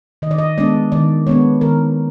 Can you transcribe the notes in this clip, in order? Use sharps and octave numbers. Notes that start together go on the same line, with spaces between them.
D#3 D#5
D5
D#5
G#3 B3 D4 D5
D#3 D5
G#3 B3 D4 C#5
D#3 A#4